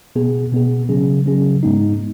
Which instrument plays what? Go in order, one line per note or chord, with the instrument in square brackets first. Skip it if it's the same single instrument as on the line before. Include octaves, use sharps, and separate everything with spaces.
[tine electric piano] B2 B3 G#4
B2 B3 G#4
C#3 F#3 C#4 G#4
C#3 F#3 C#4 G#4
G#2 G#3 B3 D#4